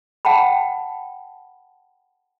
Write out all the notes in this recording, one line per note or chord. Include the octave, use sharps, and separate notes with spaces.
F#5 G5 A5 B5